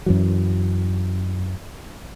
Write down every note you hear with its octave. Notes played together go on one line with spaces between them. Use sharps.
F#2 E3 F#3